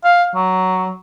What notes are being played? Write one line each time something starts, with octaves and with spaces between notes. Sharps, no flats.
F5
F#3